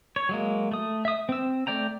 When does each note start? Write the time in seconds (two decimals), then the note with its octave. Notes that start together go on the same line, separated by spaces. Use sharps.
0.16 C#5
0.29 F#3 G#3 A#3
0.72 A3 D#6
1.05 E5 D#6
1.29 C4 E6
1.67 A3 D5 G5 A#5